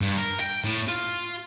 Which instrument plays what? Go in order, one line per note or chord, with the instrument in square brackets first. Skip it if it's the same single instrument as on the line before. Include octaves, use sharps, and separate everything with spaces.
[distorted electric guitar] G2
A#4
G5
A2
F4